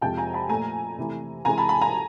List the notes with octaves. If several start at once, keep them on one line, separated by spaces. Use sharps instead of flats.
F2 C3 F3 G#3 G5 A5
G#5 A#5
A5 B5
A#2 F3 A3 G#5 A#5
C3 E3 A3
C3 E3 G#3 G#5 A#5
A5 B5
A5 B5
G#5 A#5